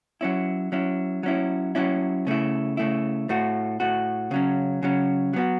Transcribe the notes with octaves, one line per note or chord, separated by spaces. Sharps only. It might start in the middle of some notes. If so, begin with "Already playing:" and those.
F#3 C#4 E4
F#3 C#4 E4
F#3 C#4 E4
F#3 C#4 E4
C#3 A3 E4
C#3 A3 E4
A2 A3 F#4
A2 A3 F#4
C#3 F#3 C#4
C#3 F#3 C#4
F#3 B3 F#4